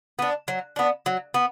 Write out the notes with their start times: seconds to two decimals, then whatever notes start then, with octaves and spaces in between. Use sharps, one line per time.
0.19 B3 D4
0.48 F#3
0.76 B3 D4
1.06 F#3
1.34 B3